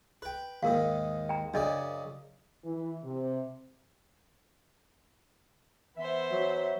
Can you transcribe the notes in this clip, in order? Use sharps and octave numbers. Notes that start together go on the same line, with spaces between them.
B4 G5
D#2 G#2 D#3 A#4 F5
G5 A#5
F#2 C#3 D4 D5 D#5 D#6
E3
C3
E3 B3 C5 E5
F#3